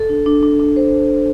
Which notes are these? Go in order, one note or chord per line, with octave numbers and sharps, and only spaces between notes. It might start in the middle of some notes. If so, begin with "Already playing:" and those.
Already playing: A4
D4
D4
D4
D4
C5